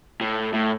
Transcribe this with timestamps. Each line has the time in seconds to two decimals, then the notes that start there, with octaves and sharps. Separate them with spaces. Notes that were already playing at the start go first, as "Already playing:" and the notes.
0.21 A2
0.53 A2